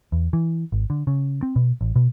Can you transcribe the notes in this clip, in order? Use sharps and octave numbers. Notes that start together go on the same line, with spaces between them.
E2
E3
G#1
D3
C#3
C4
B2
A1
B2